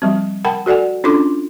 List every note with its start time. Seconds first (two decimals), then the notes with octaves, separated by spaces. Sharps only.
0.02 F3 G3 C4
0.45 A#4 F#5 G5 A5 B5
0.66 F#4 A4 D5 F#5 G#5
1.04 C#4 D4 F4 A4 C6 D6